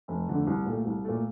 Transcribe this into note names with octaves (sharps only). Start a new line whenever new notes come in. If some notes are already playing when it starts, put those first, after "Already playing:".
F1
F2 D3 A3
C2
A#2 A3
C2
A#2 A3